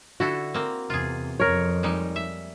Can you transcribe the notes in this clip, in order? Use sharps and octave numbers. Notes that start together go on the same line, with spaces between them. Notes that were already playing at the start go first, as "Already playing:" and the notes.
D3 E4 F#4 A4
A#3 C4
E2 C3 F4 G#4
F2 A#4 C#5
G3 G#3 D#4
E5